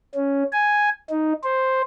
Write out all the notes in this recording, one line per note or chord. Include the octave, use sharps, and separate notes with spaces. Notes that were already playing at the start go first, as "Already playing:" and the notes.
C#4
G#5
D#4
C5